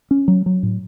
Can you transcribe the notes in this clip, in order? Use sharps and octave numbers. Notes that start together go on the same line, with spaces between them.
C#4
F#3
F#3
A2